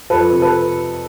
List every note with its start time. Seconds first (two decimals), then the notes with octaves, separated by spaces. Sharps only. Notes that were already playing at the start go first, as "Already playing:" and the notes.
0.10 F2 A4 B4
0.32 C3
0.42 A4 B4